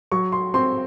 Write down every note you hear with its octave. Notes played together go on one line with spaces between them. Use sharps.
F#3 C#6
C6
C4 C6